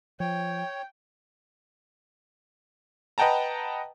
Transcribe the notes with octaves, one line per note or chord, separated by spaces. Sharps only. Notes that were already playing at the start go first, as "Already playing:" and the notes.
F3 C#5 G5
B4 D#5 F#5 G5 A5 A#5